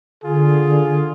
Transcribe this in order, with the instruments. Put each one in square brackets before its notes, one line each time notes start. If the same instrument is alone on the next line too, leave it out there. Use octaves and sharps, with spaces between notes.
[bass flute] D3 [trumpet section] F4 G#4